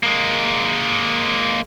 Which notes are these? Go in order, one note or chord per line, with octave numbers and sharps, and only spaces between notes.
G#3 A#3